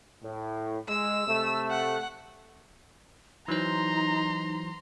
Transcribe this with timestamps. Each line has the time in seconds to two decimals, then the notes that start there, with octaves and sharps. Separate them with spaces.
0.23 A2
0.89 G#3 E6
1.27 C3 A3
1.70 F#5
3.48 E3 F#3 D#4 C5 A#5 C6